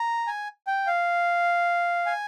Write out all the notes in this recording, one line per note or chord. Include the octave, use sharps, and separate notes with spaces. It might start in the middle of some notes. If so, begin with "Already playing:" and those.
Already playing: A#5
G#5
G5
F5
G#5